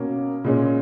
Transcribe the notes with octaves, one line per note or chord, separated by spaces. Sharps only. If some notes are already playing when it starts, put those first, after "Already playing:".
Already playing: B2 A#3 C#4
A#2 G#3 C#4